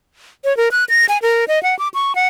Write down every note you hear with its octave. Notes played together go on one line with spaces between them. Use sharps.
C#5
A#4
F#6
A#6
G#5
A#4
D#5
F#5
D6
C#6
F#5